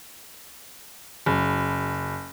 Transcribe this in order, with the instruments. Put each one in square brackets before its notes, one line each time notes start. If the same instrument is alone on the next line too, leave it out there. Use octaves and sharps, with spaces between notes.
[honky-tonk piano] F#1